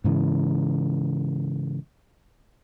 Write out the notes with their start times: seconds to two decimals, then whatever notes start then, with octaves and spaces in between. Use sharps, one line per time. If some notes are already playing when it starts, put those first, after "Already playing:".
0.04 G#2 C#3 E3